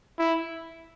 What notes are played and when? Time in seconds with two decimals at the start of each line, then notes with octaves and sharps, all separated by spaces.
0.19 E4